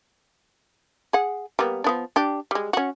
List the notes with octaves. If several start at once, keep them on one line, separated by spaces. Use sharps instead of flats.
G#4 F#5
G3 A#3 B3
F3 B3 D4
D4 G4
G3 G#3
C#4 F#4